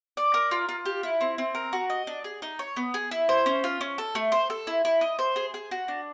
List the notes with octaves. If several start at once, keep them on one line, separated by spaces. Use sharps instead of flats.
D5
A#4
F4
F4
G4
E4
C4
C4
A#4
F#4
D#5
D4
G#4
D#4
C#5
B3
G#4
E4
C5
C#4
F4
C#4
A4
A3
C5
A4
E4
E4
D#5
C5
G#4
G#4
F#4
D4